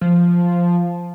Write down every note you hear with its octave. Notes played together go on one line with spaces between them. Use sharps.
F3